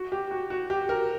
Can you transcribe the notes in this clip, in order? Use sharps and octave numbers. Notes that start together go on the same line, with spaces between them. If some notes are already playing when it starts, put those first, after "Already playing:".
Already playing: F#4
G4
F#4
F#4
G4
A#4